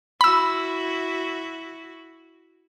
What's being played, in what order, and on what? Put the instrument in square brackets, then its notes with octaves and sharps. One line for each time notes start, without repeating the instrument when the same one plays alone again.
[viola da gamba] E4 F#4 [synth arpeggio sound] B5 E6